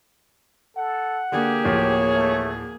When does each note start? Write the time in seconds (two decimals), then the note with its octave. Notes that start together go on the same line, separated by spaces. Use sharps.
0.77 A4 F#5
1.32 D3 A#3 G4 G#4
1.65 D1 F3 C#5
2.14 A3